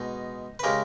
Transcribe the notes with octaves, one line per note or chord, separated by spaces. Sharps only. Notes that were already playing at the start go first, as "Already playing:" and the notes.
Already playing: B2 G#3 D#4
B4
C#3 G#3 G4 A#4